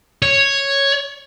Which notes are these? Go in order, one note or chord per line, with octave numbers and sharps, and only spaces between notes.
C#5